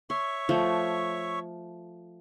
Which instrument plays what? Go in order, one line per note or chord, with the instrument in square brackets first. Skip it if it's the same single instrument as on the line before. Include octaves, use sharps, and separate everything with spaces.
[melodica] C#5 E5 C#6 [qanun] C6
[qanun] F3 A3